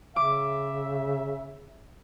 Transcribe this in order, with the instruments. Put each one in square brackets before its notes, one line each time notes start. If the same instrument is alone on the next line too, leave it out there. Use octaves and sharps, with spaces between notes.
[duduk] C#3 [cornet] E5 [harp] D6